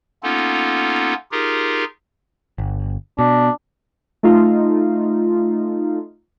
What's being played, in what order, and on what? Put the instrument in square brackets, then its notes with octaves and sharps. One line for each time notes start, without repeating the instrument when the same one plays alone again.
[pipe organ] A#3 B3 C#4 D#4 F4 A4
D#4 F4 G4 G#4 A#4
[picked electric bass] G1
[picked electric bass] B2 [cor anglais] D4
[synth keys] A3 D#4 F4